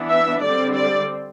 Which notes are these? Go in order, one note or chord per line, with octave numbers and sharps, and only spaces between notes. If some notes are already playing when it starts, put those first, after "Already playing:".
Already playing: E3 B3 D4
E5
D3 G3 C4 D5
D5